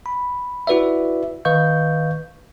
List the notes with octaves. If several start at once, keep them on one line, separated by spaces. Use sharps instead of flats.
B5
E4 F#4 B4 D5 E5
D#3 B4 D#5 F5 C#6 G6